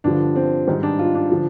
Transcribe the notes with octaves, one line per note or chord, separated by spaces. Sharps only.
G2 D3 F3 D4
C4
G#2 D#3 G3
D4
F4
D4
D3 F3